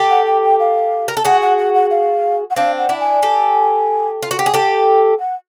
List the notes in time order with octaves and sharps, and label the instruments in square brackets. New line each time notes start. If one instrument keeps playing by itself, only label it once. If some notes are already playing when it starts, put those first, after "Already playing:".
Already playing: [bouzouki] G4 A4
[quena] F#5
G5
G5
F5
[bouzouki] A#4
A4
[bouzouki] F#4 G#4 [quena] F#5
[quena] F#5
F#5
F#5
F5
F#5
[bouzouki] C4 D4 [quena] F5
[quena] F#5
[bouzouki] D4 E4
[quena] G#5
[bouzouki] G4 A4
F4
F#4
G4
G#4
[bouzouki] G4 A4 [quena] G5
[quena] F#5